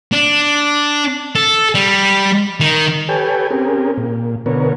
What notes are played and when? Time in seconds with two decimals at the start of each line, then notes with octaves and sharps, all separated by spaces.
0.12 D4
1.35 A4
1.75 G3
2.60 D#3
3.09 G4 A4 B4 C#5 G5 G#5
3.50 C4 C#4 G4 G#4 A#4
3.97 A#2
4.46 B2 D3 B3 A#4 C#5